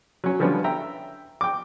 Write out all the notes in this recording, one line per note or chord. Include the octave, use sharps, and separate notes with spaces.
F#3 C#4
D3 F3 G3 B3 C#4
E5 G5 A#5
G5 D6